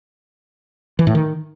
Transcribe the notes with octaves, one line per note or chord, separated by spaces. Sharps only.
E3
A2
D#3